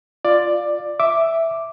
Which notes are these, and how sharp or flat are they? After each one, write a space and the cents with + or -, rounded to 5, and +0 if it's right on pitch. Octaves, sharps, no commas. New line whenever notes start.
F4 +0 D5 +10
E5 +0 D6 +0